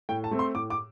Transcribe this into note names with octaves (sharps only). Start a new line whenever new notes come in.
A2 G5
A5
A3 C4
C6
A2 D6
D6